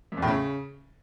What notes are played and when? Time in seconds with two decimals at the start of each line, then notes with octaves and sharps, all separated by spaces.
0.12 F#2
0.17 E2
0.22 A2
0.27 C#3